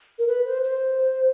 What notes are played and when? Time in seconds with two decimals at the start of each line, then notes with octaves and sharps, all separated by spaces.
0.19 A#4
0.28 B4
0.45 C5
0.63 C5